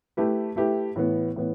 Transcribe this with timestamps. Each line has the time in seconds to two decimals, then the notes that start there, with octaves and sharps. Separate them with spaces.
0.17 A3 E4 G4 B4
0.56 A3 E4 G4 B4
0.96 A2 E3 B3
1.36 A2 E3 B3